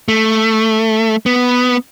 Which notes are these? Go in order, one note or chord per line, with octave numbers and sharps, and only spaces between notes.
A3
B3